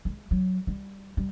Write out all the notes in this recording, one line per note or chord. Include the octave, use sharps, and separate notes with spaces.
G#3
F#3
G3
G3